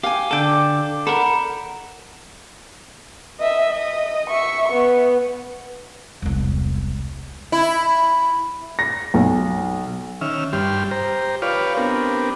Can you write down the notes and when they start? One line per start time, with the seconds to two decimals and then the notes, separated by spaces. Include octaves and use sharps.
0.03 G4 F5 G#5
0.31 D3 A4 D5 G5
1.07 A4 A#4 F#5 B5
3.39 D#5 E5
3.70 D#5
4.30 E5 C#6
4.72 B3
6.22 E1 C2
7.52 E4
8.79 A#6
9.14 B1
10.21 D#3 C#4 E5 F6
10.53 G2 G3 G4 C6 F6
10.91 G4 C5 A#5
11.42 F4 G4 B4 C#5 D5 F5
11.77 B3 C4 D4 G4 A#4